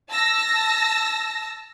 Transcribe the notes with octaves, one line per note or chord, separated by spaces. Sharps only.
A5 E6 A#6